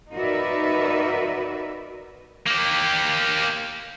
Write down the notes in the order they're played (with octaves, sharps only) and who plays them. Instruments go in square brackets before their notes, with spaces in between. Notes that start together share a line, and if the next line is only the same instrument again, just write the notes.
[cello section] D#4 F#4 A#4 B4 D5 E5
[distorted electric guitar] A#3 G4